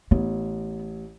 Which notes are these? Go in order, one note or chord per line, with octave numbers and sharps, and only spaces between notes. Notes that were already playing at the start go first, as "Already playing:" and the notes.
A1 B3